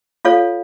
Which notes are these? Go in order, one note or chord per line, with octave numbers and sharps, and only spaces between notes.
F4 A4 C#5 F5